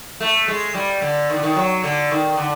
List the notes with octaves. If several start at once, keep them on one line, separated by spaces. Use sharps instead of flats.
A3
G#3
G3
D3
D#3
D3
D#3
F#3
D3
D#3
D3